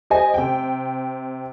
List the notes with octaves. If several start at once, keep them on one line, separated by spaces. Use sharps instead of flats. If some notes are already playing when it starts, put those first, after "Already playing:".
G4 C5 D#5 G#5
C3 G5